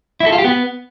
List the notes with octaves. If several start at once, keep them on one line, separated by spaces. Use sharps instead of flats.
E4
A4
F4
G4
B3